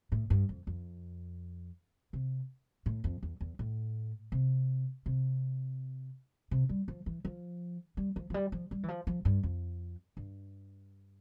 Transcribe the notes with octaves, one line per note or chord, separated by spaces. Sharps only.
A2
G2
F2
F2
C3
A2
F2
E2
E2
A2
C3
C3
C3
G3
F3
E3
F3
G3
F3
F3
G3
F3
G3
E3
F3
F3
G2
F2
G2